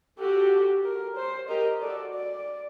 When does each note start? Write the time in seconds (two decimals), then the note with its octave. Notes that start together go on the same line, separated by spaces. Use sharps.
0.19 F#4 G4 A4
0.85 A#4
1.17 C5
1.49 G4 A#4 D#5
1.82 F#4 A4 D5
2.14 D5